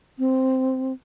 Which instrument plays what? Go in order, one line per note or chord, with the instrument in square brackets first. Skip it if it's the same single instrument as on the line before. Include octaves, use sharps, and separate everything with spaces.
[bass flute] C4